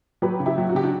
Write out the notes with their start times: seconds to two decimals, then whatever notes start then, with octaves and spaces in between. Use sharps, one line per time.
0.22 F#3 G4 B4
0.40 C#3
0.46 E4 G4
0.58 F#3
0.69 F#4
0.75 C#3 G4
0.83 D4 F#4